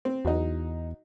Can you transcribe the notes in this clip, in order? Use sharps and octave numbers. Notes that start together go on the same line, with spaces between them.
C4
E2 F#3 D#4